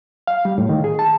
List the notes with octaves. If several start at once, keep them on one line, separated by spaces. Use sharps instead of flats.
F5
G3
A2
D#3
G#4
A5